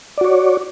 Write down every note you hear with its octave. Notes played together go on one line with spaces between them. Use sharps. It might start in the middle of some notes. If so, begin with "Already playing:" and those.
F#4 C#5 D5